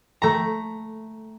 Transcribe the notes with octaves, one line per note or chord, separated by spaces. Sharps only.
A3 A#5